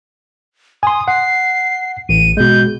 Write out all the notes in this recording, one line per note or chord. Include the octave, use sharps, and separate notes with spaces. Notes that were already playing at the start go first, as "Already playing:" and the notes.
G#5 C6 D#6
F#5 C7
A1 D#7
B2 G#3 G6